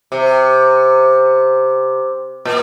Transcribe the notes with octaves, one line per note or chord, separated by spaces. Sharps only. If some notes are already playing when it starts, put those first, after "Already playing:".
C3
A#2